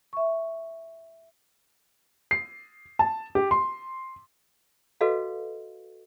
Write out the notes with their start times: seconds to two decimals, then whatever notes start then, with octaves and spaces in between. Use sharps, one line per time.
0.13 E5 C#6
2.31 C7
2.99 A5
3.35 G4
3.51 C6
5.01 F#4 A4 B4 D#5 F5